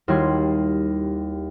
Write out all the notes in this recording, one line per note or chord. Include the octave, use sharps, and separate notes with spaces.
D#2 G3 E4 F#4 C6 G#6